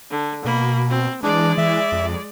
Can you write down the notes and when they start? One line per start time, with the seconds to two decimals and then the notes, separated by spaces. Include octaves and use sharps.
0.10 D3
0.45 B2 A#3 B5
0.90 C4
1.23 E3 G#3 D4 D5
1.58 E3 E5
1.92 F2